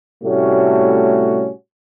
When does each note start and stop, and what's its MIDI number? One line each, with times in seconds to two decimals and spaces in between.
0.24 1.50 45
0.24 1.50 48
0.24 1.50 55
0.24 1.50 57
0.24 1.50 61
0.24 1.50 66